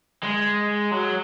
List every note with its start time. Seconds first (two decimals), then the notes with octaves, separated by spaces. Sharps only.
0.23 G#3
0.91 F#3